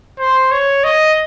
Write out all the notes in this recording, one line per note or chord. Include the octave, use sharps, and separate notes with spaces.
C5
C#5
D#5